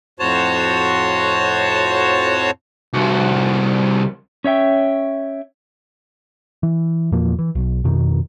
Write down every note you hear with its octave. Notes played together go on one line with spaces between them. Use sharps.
F2 A2 F#4 C5 C#5 A5
C2 F#4
C#4 C#5 E5 G5
E3
E2 A#2 F3 A#3
E3
B1
F2 B2 D#3